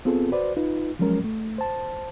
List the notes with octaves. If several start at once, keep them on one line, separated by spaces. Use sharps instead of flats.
B3 C4 F4 G#4 A4
F#4 B4 C5 D5
D#4 F4 B4
F3 F#3 G#3 C#4 A#4
A3
C5 A5